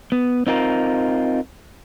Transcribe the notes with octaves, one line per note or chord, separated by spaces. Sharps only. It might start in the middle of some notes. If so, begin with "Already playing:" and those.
B3
C4 D#4 F4 A#4